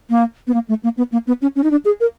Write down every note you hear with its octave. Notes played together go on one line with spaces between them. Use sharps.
A#3
B3
A#3
A3
A#3
B3
A#3
B3
C#4
C#4
D#4
D4
G#4
A#4